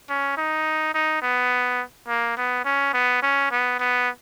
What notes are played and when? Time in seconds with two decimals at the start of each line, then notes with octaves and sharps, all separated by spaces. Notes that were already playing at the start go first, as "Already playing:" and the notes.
0.09 C#4
0.37 D#4
0.94 D#4
1.22 B3
2.08 A#3
2.37 B3
2.65 C#4
2.94 B3
3.22 C#4
3.51 B3
3.79 B3